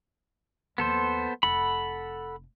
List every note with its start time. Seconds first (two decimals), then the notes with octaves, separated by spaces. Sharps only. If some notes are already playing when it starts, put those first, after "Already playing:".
0.78 D#2 F3 B3 A4 C5
1.43 F1 A4 F#5 B5